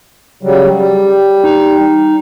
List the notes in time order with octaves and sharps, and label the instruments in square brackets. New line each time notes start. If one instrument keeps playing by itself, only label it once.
[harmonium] C#3 F#3 G3
G3
[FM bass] D#4